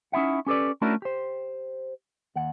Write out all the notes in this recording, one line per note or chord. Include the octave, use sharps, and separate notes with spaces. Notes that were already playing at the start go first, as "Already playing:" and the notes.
C#4 D#4 E4 E5 F#5
C#4 G4 A4 B4 D5
A3 C#4 D4 E4 F#4 A#4
G4 C5
D#2 F#5